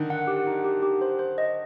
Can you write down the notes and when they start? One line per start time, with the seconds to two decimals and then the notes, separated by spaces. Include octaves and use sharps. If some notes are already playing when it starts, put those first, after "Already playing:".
Already playing: D3 D#3
0.10 F#5
0.27 G4
0.47 D#4
0.64 G4
0.82 G4
1.02 C5
1.19 C5
1.38 D#5